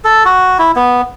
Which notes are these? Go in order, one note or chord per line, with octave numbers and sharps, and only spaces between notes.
A4
F#4
E4
B3